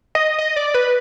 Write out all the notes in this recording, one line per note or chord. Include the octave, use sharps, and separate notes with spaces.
D#5
D#5
D5
B4